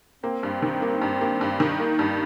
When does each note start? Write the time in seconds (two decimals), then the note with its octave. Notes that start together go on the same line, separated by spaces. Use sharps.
0.23 A#3 C4
0.43 G2
0.62 D#3
0.82 A#3
1.02 G2
1.21 A#3
1.41 G2
1.60 D#3
1.80 A#3 D#4
1.99 G2